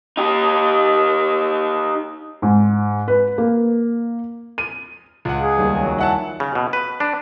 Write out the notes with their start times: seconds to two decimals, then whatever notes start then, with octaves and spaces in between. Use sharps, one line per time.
0.17 D#4 G4
2.42 G#2
3.08 B4
3.38 A#3
4.58 D#7
5.25 C#2 F4 F#5 D#7
5.40 G#4
5.56 D#2 G3 B3
5.75 F#3 G#5 A#5
5.98 E4 F#5 A5
6.40 C#3
6.55 B2
6.73 B4
7.00 D4